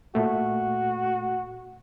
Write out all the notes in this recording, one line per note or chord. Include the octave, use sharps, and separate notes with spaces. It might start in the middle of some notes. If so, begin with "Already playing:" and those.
A#2 A3 F#4